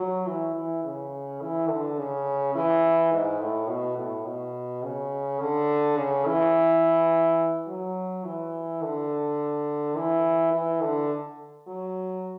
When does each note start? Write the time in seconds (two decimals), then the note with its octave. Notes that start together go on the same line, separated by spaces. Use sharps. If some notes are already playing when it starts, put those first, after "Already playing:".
Already playing: F#3
0.27 E3
0.55 E3
0.84 C#3
1.41 E3
1.69 D3
1.98 C#3
2.55 E3
3.12 G#2
3.40 A2
3.69 B2
3.97 A2
4.26 B2
4.83 C#3
5.40 D3
5.97 C#3
6.26 E3
7.67 F#3
8.24 E3
8.82 D3
9.95 E3
10.52 E3
10.81 D3
11.67 F#3